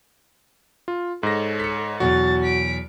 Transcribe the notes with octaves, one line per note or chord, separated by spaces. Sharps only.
F4
G#2 A4 C#5 A#6
B6 C#7
E2 B2 F#3 F#4 A6
B6 D7